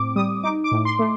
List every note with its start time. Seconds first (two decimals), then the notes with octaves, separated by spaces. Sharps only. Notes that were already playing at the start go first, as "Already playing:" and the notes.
Already playing: A2 C4 D6
0.16 G3 D#6
0.43 D#4 D6
0.64 D6
0.72 A2
0.85 C6
0.99 A3